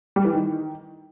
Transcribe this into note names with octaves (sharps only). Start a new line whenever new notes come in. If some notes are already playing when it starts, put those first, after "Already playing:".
G3
E3
D#3